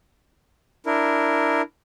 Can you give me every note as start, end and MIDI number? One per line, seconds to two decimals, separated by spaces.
0.86 1.62 62
0.86 1.62 64
0.86 1.62 70